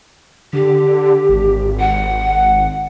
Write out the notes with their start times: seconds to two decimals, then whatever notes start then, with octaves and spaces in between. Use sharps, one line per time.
0.53 D3 G4
1.29 G#1
1.79 F#5